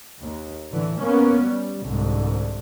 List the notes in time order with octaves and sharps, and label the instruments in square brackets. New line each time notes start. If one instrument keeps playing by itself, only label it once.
[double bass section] D#2
A2 D3 E3
A#3 B3 C#4
G3
C2 G#2 D3